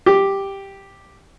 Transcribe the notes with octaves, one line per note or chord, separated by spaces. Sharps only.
G4